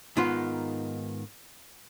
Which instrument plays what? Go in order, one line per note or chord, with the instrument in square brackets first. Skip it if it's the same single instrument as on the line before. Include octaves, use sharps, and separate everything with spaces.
[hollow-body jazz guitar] G#2 D#3 B3 D#4 F4